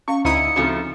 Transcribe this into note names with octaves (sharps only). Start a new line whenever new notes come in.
C#4 F5 C#6
D2 D#4 E4 D#6 C#7
C#3 F3 A3 C4 D#4 F#4